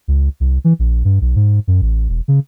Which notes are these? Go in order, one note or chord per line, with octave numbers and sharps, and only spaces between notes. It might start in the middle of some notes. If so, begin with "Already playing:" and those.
C#2
C2
E3
A#1
G2
B1
G#2
F#2
A1
E1
C#3